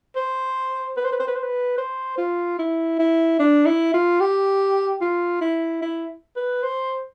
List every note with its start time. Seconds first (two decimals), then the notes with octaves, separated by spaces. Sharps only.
0.16 C5
0.97 B4
1.05 C5
1.12 B4
1.20 C5
1.27 B4
1.35 C5
1.43 B4
1.78 C5
2.18 F4
2.59 E4
2.99 E4
3.39 D4
3.66 E4
3.94 F4
4.20 G4
5.01 F4
5.41 E4
5.82 E4
6.36 B4
6.63 C5